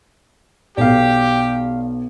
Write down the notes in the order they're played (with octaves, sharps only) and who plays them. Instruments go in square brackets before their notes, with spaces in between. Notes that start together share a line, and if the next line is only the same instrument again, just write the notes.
[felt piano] B1 [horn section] G4 [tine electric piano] D5 F5